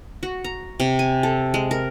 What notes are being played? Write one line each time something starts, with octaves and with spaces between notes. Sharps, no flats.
F#4
A#5
C3
G#5
A4
G#3
A#4